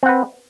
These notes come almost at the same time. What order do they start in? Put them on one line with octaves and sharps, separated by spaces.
C4 F#5 B4